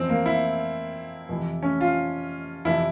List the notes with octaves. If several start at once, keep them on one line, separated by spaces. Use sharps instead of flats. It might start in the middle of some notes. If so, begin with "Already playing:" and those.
Already playing: F2 E3 C4
A#3
E4
F2 C3 E3
C#4
F4
F2 C3 E3 E4